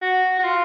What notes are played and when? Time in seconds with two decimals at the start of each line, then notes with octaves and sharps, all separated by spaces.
0.02 F#4
0.39 F#4
0.44 F4